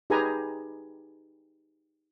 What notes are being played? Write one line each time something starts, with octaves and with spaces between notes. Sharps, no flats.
D#4 G4 G#4 B4 G#5 A#5